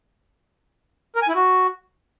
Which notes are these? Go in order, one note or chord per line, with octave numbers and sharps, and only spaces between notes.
A#4
G#5
E4
F#4